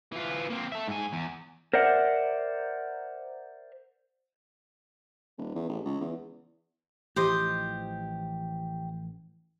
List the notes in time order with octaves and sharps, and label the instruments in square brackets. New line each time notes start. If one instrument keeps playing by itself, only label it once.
[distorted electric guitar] E3 F4
A#3 C4
A4 E5
G#2 G#5
E2
[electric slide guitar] A#4 C5 D5 E5 F#5
[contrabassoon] D#1
E2
A1
C#2
E2
[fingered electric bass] A1 E3 F3 [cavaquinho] G4 C5 D#5